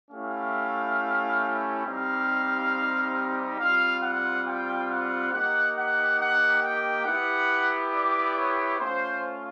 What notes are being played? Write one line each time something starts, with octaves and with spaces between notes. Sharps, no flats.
A3 C#4 E4 G4 F5
G3 C4 D#4 G4 F5
G3 C4 F4 F5
F#5
G5
F#5
A#3 D#4 G4 F#5
F#5
F#5
G5
B3 E4 G4 F#5
D5
C#5
A3 C#4 F4 C5